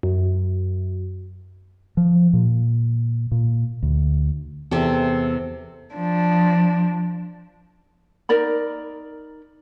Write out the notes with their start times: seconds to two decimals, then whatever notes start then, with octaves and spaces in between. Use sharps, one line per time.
0.03 F#2
1.97 F3
2.33 A#2
3.32 A#2
3.83 D2
4.71 E2 C3 A4
5.95 F3 D4
8.29 D#4 A#4 D5 B5